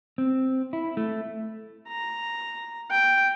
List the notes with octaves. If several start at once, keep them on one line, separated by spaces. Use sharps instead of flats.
C4
E4
A3
A#5
G5